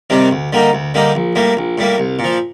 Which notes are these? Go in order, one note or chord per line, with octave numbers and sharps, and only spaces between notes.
C3 D#3 G3 D4
D2
D3 G3 A#3 D#4
D2
D3 G3 A#3 D#4
A#1
A2 G3 A#3
A#1
A2 G3 A#3
C2
A#2
F3